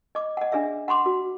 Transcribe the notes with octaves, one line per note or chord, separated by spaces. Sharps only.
D#5 D6
D#5 F#5
D4 G#4 D5 E5
F#5 B5 C6 D6
F#4